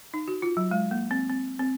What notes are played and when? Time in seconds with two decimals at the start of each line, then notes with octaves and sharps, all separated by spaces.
0.14 D#4
0.28 F#4
0.42 F4
0.57 F#3
0.71 G#3
0.91 A#3
1.11 C4
1.29 C4
1.59 C4